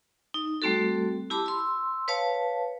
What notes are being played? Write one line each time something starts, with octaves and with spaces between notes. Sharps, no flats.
D#4
G3 A3 C4 F#4 A4
E4 G4 A5 B5 D6
C6 E6
B4 C#5 F5 A5